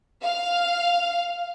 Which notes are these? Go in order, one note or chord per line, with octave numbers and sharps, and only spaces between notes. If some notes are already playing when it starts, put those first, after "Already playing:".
F5